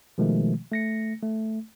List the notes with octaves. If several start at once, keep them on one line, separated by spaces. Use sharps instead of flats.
B2 D#3 F3 G#3 A3
A3 A#6 C#7
A3